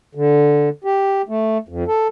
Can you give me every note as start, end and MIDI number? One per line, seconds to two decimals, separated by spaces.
0.15 0.69 50
0.84 1.22 67
1.29 1.58 57
1.69 1.84 41
1.88 2.08 69